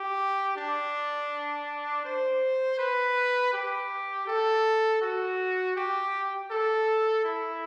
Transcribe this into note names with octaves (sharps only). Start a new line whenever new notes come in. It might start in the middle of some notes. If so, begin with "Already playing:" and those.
Already playing: G4
D4
C5
B4
G4
A4
F#4
G4
A4
E4